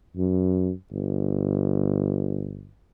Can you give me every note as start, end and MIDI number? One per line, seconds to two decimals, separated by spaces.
0.17 0.71 42
0.91 2.69 31